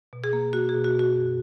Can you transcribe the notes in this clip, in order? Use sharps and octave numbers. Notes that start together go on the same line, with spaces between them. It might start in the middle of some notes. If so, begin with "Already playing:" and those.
B2
G#4
A#3
A#3 F#4
G#4
B2
F#4
B2
F#4
F#2